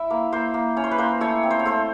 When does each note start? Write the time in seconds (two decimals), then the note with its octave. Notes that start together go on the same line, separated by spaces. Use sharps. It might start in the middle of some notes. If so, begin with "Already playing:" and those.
Already playing: E4 E5
0.10 A#3
0.33 A#3 C5
0.54 A#3
0.76 C#4 C#5
0.84 C5
0.91 B4
0.98 A#3 C5
1.21 A3 C#5
1.43 C4
1.51 C5
1.59 C#5
1.66 A3 C5